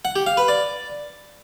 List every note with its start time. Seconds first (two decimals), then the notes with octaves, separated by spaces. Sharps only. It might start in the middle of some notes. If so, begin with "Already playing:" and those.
0.05 F#5
0.16 G4
0.27 F5
0.37 B4
0.48 D5